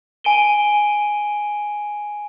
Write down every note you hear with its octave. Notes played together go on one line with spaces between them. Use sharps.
G#5 D7 D#7 G7